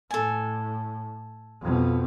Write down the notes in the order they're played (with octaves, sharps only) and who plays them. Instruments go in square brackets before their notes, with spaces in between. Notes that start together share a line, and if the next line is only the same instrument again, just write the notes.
[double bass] A2 [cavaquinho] A4 G#5
[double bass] F2 B2